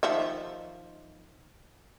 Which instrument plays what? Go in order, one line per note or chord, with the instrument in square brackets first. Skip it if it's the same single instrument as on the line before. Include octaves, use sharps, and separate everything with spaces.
[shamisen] D#3 F3 E5